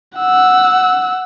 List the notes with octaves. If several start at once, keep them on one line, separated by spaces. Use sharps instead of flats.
F#5 E6